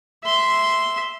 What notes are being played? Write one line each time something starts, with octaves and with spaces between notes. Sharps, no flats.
E5 C6